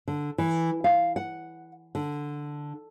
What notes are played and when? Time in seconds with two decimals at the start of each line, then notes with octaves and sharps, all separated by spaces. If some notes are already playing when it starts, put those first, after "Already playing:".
0.08 D3
0.38 E3
0.84 F5
1.16 F#5
1.95 D3